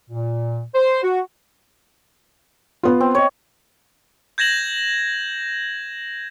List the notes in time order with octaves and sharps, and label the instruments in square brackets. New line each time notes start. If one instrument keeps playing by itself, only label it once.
[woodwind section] A#2
C5
F#4
[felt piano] B3 F4
[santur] C4
C#5 D#5
[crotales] G6 G#6 A#6 E7 F#7